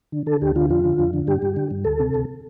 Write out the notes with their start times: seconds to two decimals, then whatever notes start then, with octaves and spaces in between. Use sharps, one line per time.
0.12 D3
0.26 D3 A4
0.41 D2 G4
0.56 D3 F4
0.69 F2 F4
0.84 D3
0.99 F2
1.13 D3
1.27 G2 G4
1.42 G2
1.56 D3
1.71 G2
1.85 D2 A4
2.00 C3
2.14 D2